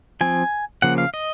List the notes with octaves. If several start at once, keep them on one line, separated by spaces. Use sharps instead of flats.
F3 C4 G#5
C#3 F3 A#3 F#5
F5
D#5